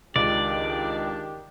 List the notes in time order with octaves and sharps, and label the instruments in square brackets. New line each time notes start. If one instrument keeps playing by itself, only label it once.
[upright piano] C#2 [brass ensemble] D#3 G4 [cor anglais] D4 [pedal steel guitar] D5